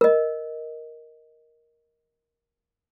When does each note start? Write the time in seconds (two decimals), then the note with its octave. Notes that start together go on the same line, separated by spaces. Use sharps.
0.01 A#4 D#5